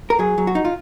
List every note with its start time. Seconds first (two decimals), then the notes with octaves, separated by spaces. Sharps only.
0.10 A#4
0.19 F#3 G#4
0.38 F#3
0.47 F#4
0.55 D#4
0.65 F4